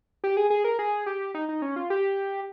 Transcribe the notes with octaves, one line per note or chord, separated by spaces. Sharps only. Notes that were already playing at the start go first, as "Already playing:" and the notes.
G4
G#4
G#4
A#4
G#4
G4
D#4
D#4
C#4
F4
G4